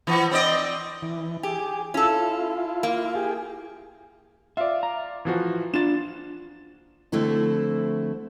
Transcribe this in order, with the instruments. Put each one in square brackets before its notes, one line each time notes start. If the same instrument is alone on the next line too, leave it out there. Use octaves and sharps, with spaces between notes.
[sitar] E3 B3
C4 D5 D#5
[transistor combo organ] E3
[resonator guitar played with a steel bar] G4 [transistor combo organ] G#4
[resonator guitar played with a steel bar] C#4 A4 [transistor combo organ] E4 F4
[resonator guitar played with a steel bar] A#3
[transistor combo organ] G4 G#4
[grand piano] F4 D5 [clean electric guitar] E5
[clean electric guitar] A#5
[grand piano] E3 F3 F#4
[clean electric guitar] D4 F4 [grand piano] A6 E7
[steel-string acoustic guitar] D3 F3 A3 C4 E4 F#4